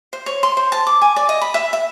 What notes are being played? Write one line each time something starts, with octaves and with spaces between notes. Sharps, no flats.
C5
C#5
C6
C5
A5
D6
G#5
D5
D#5
B5
E5
E5